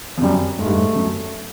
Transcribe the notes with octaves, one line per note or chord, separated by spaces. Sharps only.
F2
F#2 G3
G#2 A3
G2
G#2
F#2